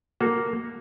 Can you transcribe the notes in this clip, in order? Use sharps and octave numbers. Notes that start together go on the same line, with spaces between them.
A#3 F#4 A4